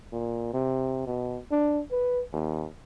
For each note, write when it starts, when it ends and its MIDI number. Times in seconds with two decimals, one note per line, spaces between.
0.13 0.52 46
0.53 1.07 48
1.07 1.39 47
1.51 1.81 62
1.92 2.22 71
2.33 2.66 39